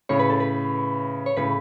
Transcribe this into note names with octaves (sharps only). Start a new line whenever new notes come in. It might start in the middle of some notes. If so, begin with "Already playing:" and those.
A2 C#3 C#5
B4
A4
B4
C#5
A2 C#3 B4